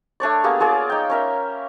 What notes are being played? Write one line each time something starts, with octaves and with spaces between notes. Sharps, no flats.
A3 D4 C#5 D5
A#3 B3 G4 G#4
F4 G#4 C#5 D5
D#4 G5
C#4 A#4 E5